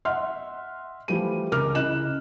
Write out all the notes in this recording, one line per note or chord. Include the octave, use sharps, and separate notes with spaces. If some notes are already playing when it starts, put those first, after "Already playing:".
D#5 E5 F#5 C6 F6
E3 F3 G3 A3 E4 D#7
C#2 A#4 D6 F6
C#3 E4 D#5 F#6 E7